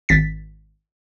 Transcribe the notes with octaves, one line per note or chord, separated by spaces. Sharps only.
G#1 A6 B6